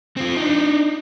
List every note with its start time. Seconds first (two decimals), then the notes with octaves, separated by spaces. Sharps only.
0.17 C4 F4
0.37 D4 D#4